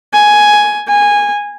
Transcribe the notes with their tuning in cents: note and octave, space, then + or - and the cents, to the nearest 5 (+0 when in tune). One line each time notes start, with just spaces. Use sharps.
G#5 +5
G#5 -15